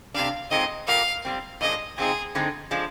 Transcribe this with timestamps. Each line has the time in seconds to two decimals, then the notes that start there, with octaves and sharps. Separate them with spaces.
0.14 C3 G3 D4 F5
0.51 A#2 G#3 C4 D#4 D#5
0.87 A#2 G3 A#3 F5
1.25 A#2 G3 C4
1.61 A#2 F3 G#3 D4 D#5
1.98 C3 F3 G#3 C4 D#4 G#4
2.35 D3 G#3 C4 D#4
2.71 F3 G#3 D4